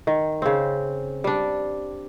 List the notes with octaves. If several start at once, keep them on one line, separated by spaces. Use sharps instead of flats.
D#3
C#3 C4
G3 D4